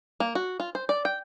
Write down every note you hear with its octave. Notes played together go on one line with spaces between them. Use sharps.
A#3
F#4
F4
C5
D5
G5